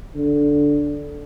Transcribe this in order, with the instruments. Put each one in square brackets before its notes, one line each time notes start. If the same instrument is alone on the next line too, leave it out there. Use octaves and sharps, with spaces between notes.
[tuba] D3